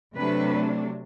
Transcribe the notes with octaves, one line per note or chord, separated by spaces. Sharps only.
C3 F#3 A3 D4 B4